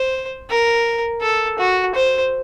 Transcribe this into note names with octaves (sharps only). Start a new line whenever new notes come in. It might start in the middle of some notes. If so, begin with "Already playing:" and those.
Already playing: C5
A#4
A4
F#4
C5